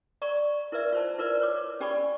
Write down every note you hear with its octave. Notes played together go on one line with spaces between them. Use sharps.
D5 A#5 C#6
E4 A#4 B4 D5 E5
F4 C5 A5
E4 F4 A#4 B4 D5
B4 C#5 D6
C#4 G4 D5 G#5 B5 C#6